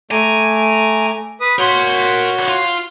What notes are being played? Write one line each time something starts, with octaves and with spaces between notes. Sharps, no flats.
A3 G#5 A#5 D6
B4 D#6
F#4 A#4 C#5 C6 G6
F4